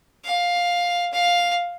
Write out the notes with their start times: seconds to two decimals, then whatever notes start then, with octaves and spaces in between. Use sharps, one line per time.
0.25 F5
1.13 F5